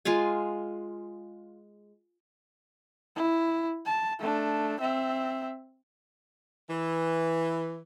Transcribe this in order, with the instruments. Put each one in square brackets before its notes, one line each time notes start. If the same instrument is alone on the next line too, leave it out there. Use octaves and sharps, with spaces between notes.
[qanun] G#3 F4 F5 G#5
[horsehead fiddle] E4
A5
A3 D4
C4 E5
[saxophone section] E3